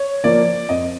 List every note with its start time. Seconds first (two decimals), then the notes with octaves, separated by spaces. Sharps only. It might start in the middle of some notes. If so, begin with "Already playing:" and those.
Already playing: C#5
0.24 F3 A#3 D5
0.69 F2 D#5